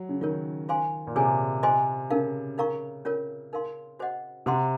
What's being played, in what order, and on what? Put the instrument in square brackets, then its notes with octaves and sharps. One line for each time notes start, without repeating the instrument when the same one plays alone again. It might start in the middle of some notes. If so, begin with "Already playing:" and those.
Already playing: [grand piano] F#3
C#3
[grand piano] D#3 [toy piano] F4 A#4 C#5
[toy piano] F4 C5 F5 G#5 C6
[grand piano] A#2
[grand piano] C3 [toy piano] G#4 C#5 G#5
[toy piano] F4 C5 D#5 G#5 C6
[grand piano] C#3 [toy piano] D#4 A#4 F5
[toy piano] D#4 A#4 F5 A#5 C#6
C#4 F4 A#4 C#5
D#4 A#4 F5 C6
F#4 C5 D#5 F#5
[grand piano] C3 [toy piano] C5 F#5 C6